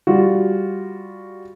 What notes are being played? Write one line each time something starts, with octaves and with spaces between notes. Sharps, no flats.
G3 F4 F#4